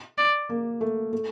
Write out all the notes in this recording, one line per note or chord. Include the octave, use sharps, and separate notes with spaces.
D5
A#3
A3
A3